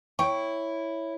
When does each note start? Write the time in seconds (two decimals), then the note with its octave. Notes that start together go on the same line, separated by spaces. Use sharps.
0.19 E4 C#5 G5 C#6